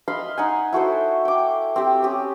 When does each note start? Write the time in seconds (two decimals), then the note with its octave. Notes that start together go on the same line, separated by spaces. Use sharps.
0.08 D#5 F5 B5 C6
0.37 D#4 F#5 G#5
0.73 E4 F#4 A4 C5
1.25 G5 D6
1.76 C4 G4
2.02 C#4 G4 D#6